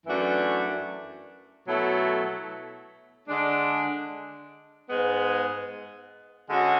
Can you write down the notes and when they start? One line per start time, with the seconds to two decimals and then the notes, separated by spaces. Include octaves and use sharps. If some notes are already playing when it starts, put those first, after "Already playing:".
0.06 F#2 E3 A3 D4 F#4
1.67 B2 F#3 A3 E4 A4
3.27 D3 G#3 D4
4.89 G#2 G#3 B3
6.50 D3 G#3 C#4 F#4